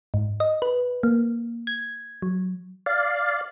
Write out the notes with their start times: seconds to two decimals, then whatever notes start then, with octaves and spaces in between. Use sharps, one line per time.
0.14 G#2
0.40 D#5
0.62 B4
1.03 A#3
1.67 G#6
2.22 F#3
2.86 D5 F5